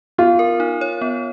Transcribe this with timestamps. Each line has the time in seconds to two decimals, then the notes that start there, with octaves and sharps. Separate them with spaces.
0.18 B3 F4
0.39 A#4
0.60 D#4
0.81 C#5
1.01 B3